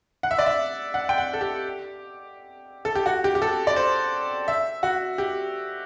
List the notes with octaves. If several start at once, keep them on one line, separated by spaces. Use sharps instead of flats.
F#5
E5
D5
E5
F#5
G5
F#5
A4
G4
A4
G4
F#4
G4
G4
A4
D5
C5
E5
F#4
G4